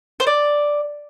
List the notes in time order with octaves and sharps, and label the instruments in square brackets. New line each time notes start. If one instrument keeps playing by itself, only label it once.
[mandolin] C5
D5